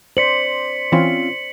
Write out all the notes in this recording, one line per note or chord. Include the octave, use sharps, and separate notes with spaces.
C5 D5 B6 C#7 F#7
E3 C4 C#4 F4